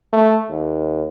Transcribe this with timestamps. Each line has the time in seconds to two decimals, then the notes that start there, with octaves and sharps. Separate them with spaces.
0.13 A3
0.50 D#2